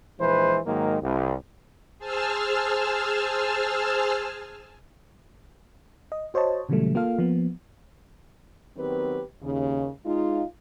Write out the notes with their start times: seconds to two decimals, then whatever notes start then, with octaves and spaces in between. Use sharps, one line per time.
0.20 A#1 E3 G#3 B4 C5
0.66 G#2 D#3 F#3 G#3 A#3
1.02 C2
1.99 G#4 C5 G#5 A5 E6 F6
6.12 D#5
6.34 F#4 C5 C#5 D#5 A5
6.69 A#2 C#3 E3 F#3 G3 A3
6.95 A#3 F4 A4 F5
7.19 F3 A#3 B3
8.76 D#3 F#3 B3 C4 G4 B4
9.42 D#2 C#3
10.04 G#3 D#4 F4